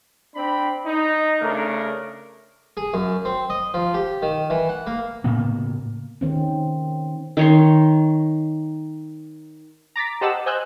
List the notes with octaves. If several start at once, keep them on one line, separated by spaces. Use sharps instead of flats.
C4 D4 B5
D#4
C#3 A3 D4 A#4
G#4
F#2
C4
D#5
F3
G4
D#3
E3
F#5
A#3
A2 C#3 A#3 B3
D#3 C4 C#4
D#3 C#5 C6
A#5 D6 A6 B6
G4 C5 D#5 F#5 A5 E6
C5 D#5 G#5 E6 F#6 G6